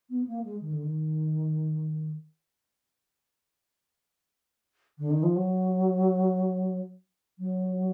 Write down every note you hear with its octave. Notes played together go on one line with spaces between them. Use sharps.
B3
A#3
G#3
D#3
D3
D#3
D3
D#3
F3
F#3
F#3